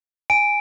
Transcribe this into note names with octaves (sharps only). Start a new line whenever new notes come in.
G#5 D7